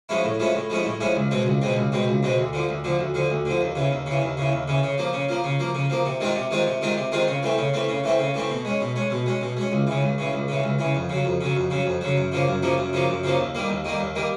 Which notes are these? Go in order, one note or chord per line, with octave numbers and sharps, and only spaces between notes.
F3 G#3 C#4 E4
A2
F3 G#3 C#4 E4
A2
F3 G#3 C#4 E4
A2
F3 G#3 C#4 E4
C#2
B2 G#3 C4
C#2
B2 G#3 C4
C#2
B2 G#3 C4
C#2
B2 G#3 C4
D2
D3 F3
D2
D3 F3
D2
D3 F3
D2
D3 F3
D#2
C#3 E3
D#2
C#3 E3
D#2
C#3 E3
D#2
C#3 E3
C#3
F3 A#3
C#3
F3 A#3
C#3
F3 A#3
C#3
F3 A#3
C3
D#3 G#3 C4 F4
C3
D#3 G#3 C4 F4
C3
D#3 G#3 C4 F4
C3
D#3 G#3 C4 F4
C#3
E3 A3 C4
C#3
E3 A3 C4
C#3
E3 A3 C4
C#3
E3 A3 C4
B2
G#3 C#4
B2
G#3 C#4
B2
G#3 C#4
B2
G#3 C#4
C#2
C#3 E3
C#2
C#3 E3
C#2
C#3 E3
C#2
C#3 E3
F2
C#3 F#3
F2
C#3 F#3
F2
C#3 F#3
F2
C#3 F#3
F#2
C#3 F3 A#3
F#2
C#3 F3 A#3
F#2
C#3 F3 A#3
F#2
C#3 F3 A#3
D#2
D#3 G3 A#3
D#2
D#3 G3 A#3
D#2
D#3 G3 A#3